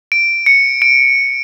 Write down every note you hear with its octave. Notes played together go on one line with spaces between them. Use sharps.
D7
C#7
D7